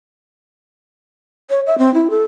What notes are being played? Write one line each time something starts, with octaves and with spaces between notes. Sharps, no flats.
C#5
E5
C4
E4
A4